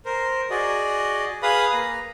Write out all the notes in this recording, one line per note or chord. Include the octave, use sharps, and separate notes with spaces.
A#4 C5
F#4 G#4 D5 D#5
G#4 B4 F5 B5 D#6
A#3 A#5